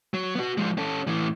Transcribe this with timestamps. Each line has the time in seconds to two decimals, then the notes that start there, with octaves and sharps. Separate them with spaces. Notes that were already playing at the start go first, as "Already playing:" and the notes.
0.14 F#3
0.35 B3 F#4
0.57 F3 G#3
0.78 C#4 A4
1.07 A2 E3